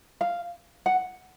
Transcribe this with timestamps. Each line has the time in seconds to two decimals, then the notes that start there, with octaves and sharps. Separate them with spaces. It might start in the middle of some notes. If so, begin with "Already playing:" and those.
0.21 F5
0.86 F#5